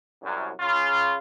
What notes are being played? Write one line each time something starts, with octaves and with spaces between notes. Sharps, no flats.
C2 F#2
C#3 F4